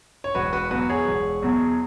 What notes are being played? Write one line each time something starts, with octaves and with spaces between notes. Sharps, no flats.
C#5
E1 F#4 B4
F#4 B4
E2 B2 F#3 F#4 B4
G#4 C#5
E1
E2 B2 F#3